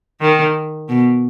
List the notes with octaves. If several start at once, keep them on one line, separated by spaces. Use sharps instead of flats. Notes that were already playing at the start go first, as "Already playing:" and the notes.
D#3
B2